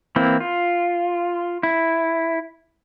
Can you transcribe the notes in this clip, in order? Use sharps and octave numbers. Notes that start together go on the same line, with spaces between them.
E3 A#3 C4 E4
F4
E4